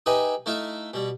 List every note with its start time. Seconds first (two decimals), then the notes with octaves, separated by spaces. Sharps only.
0.06 D#4 G4 G#4 B4 D#5 E5
0.46 A3 D#4 E4 E5 F5
0.93 B2 G3